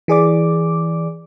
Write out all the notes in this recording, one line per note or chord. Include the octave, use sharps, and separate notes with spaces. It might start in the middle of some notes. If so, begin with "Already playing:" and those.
E3 G#4 D5 D6